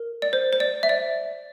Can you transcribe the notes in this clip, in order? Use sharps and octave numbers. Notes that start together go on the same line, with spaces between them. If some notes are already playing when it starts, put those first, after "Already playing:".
Already playing: A#4
D5
C5
C5
D5
E5
D5